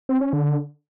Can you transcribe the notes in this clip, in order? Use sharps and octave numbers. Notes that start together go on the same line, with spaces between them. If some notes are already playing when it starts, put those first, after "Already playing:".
C4
C#4
D3